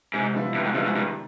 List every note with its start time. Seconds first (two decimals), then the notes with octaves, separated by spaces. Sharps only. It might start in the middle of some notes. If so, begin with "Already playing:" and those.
0.13 G#2 C3
0.34 F3 G#3 B3 E4
0.54 G2 C3
0.64 G#2
0.75 G2 F3 G#3 B3 E4
0.85 G#2
0.95 G2 D#3